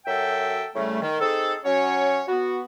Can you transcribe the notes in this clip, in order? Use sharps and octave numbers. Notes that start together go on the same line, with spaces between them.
F#2 F#3 A4 E5 G5
A2 C#3 G3 A3
D#3
C4 D#4 G#4 A4
F#3 C#4 C#5
B3 F#4